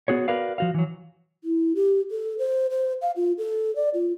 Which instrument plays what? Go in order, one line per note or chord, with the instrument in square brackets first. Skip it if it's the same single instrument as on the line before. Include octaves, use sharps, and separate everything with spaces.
[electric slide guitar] B3 F#4 G#4 C#5
F#4 A#4 B4 D5 F5
F3 F#4 F5
E3 F#3
[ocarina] E4
G4
A4
C5
C5
F5
F4
A4
D5
F4